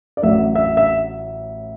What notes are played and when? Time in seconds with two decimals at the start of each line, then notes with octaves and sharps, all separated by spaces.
0.17 D5
0.22 A1 A2 F#3 E5
0.55 E5
0.77 E5